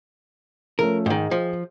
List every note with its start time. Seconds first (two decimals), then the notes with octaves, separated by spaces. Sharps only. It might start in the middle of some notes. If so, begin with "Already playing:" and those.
0.79 F3 A3 C#4 A#4
1.06 G#2 D#3 G#4 D#5 G5
1.31 F3